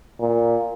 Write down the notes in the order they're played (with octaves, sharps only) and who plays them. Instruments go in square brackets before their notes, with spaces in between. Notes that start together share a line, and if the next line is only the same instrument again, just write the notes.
[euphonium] A#2